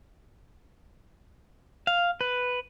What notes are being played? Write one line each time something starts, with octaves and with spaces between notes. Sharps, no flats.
F5
B4